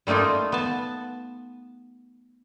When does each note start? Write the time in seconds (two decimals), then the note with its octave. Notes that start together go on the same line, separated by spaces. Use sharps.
0.07 G3 A3 A#3 D#4 F4
0.52 B3 A5